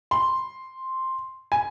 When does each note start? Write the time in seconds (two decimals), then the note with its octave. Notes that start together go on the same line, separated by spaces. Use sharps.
0.11 C6
1.52 G#5